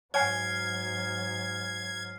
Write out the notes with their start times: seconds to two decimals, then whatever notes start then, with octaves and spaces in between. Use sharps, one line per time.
0.14 G#2 F#3 C#5 F#5 G#5 F6 G#6 C7